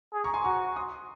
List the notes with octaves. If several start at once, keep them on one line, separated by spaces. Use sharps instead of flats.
G#4
A#5 C#6
G#5 C6
F#4 A#5 C#6
C6 D#6